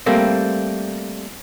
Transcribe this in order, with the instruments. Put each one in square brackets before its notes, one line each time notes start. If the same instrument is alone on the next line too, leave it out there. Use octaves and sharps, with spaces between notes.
[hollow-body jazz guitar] G3 A3 A#3 C4